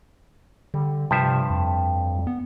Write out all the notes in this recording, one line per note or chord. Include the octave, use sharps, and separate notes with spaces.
D3 G3
G2 C3 F3 E5
F2
B3